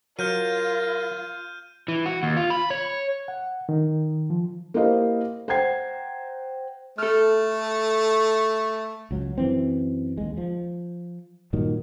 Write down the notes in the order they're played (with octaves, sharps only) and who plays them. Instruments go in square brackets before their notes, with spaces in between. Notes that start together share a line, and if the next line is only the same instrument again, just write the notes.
[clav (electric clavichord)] F#3 [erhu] F4 [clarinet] A#4 [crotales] F6 G6 D#7
[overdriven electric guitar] E3
F#4
D#2
F4
B5
C#5
[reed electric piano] F#5
D#3
F3
[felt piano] A#3 E4 G4 C5 D#5 F5
C5 F#5 G5 A#5 G#6 C7
[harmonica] A3 [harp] A4 F6
[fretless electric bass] C#2 F#3
F#2 E3 C4
D#2 G#3
F3
G2 A#2 D#3 F#3